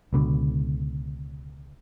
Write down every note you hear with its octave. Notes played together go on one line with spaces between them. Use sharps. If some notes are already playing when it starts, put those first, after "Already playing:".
C#2 B2 D3